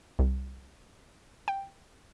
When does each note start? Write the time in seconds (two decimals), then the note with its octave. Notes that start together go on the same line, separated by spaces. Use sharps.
0.19 C2
1.48 G5